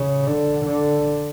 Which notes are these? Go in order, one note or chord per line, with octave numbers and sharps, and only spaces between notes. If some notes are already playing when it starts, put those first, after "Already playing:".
Already playing: C#3
D3
D3